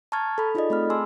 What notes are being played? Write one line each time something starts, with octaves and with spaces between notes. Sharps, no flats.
A5 A#5 C#6 F6 G#6 A6
A4 B5
D#4 F4 G#4 A4 D5 D#5
A3 C4 B5 F6
G#4 G#5 A5 C6 D6 E6